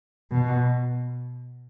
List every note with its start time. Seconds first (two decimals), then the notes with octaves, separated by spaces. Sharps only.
0.31 B2